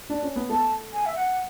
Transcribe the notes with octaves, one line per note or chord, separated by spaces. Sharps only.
D4
C#4
B3
A3 A5
G#5
E5
F#5